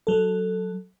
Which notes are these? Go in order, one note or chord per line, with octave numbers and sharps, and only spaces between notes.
F#3 A4